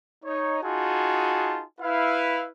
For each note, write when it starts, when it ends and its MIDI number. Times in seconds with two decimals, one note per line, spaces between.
0.25 0.59 63
0.25 0.59 73
0.63 1.63 63
0.63 1.63 65
0.63 1.63 66
0.63 1.63 68
0.63 1.63 80
0.63 1.63 81
1.81 2.48 64
1.81 2.48 71
1.81 2.48 77